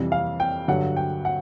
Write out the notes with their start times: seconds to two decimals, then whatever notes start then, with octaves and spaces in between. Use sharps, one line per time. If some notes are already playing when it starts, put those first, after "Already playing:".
Already playing: F2 C3 E3 G3
0.12 F5
0.40 G5
0.68 G2 D3 F#3 F#5
0.97 G5
1.25 F#5